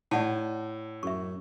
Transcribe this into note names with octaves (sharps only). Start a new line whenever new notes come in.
A2 D5 F#5 A5
F#2 E5 C#6